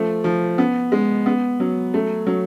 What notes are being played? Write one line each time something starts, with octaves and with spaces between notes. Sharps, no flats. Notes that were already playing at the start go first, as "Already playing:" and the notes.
Already playing: F3 A3
F3
B3
G#3
B3
F#3
A3
F#3